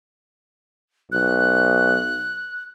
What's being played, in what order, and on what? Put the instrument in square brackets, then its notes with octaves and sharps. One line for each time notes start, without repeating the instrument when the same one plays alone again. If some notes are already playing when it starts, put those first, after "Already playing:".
[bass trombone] B1 [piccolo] F#6